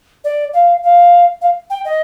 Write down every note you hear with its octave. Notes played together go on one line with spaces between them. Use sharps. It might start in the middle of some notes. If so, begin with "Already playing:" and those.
D5
F5
F5
F5
G5
D#5